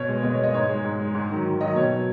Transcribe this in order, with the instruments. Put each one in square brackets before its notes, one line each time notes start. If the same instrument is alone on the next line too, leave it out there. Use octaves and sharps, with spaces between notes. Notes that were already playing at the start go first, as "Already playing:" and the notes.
Already playing: [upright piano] B2 C#5
G#3
B2 D#5
C#5
G#3 D#5
G#2 C#5
G#3
G#2
G#3
G#2
D#3 F#3
G#2
D#3 F#3 D#5
B2 C#5
F#3